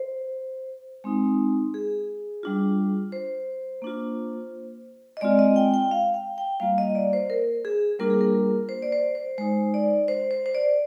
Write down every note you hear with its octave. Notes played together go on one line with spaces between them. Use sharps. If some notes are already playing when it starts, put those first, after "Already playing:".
Already playing: C5
G#3 C4 D#4
G#4
G3 D4 F4
C5
A#3 D4 F4
D#5
G#3 C4 F4 D5
D#5
G5
G5
F5
G5
G5
G3 A#3 F4 F5
D#5
D5
C5
A#4
G#4
G3 A#3 D4 F4 A#4
G#4
A#4
C5
D5
C5
C5
G#3 D#4 C5
D5
C5
C5
C5
D5